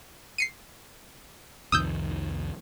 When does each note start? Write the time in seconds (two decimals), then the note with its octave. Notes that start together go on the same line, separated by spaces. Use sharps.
0.38 C7 C#7 D#7
1.72 C2 F2 D#3 D#6 E6 G6